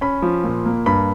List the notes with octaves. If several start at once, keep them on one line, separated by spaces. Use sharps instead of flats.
C#4 B5
F3
A#2
A#3
G2 B5